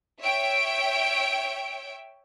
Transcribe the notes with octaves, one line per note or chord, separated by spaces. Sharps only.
C#5 E5 G5 D7